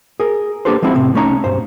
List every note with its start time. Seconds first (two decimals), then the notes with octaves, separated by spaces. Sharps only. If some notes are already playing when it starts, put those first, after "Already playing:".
0.20 G#4 A#4
0.65 A#3 D4 G4 A4 B4 C5
0.82 F3 G#3 C4 D#4 E4 F#4
0.94 A2 C3 C4
1.15 C2 A3 C#4 D#4 C#5 A#5
1.44 B1 G2 C5